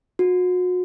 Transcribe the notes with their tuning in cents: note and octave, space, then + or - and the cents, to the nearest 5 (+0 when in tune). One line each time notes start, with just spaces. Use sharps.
F#4 -35